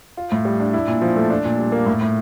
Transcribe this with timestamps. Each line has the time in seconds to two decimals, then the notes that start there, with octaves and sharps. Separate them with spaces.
0.17 F4
0.32 A2
0.45 G3
0.60 D4
0.73 E4
0.87 A#2
1.02 F3
1.16 A3
1.30 D4
1.45 A#2
1.58 G3
1.72 A#3
1.86 A2
2.01 A2